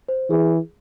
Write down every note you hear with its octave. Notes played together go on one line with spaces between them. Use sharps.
C5
E3 G#4